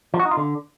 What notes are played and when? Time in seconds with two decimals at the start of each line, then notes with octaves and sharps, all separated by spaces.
0.14 F3
0.20 F#4
0.25 D#4
0.31 F4
0.37 D3